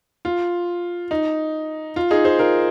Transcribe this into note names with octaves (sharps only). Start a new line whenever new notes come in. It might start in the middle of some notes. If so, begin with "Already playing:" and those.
F4
D#4
F4
D#4 G#4
G#4 C5
F4 A#4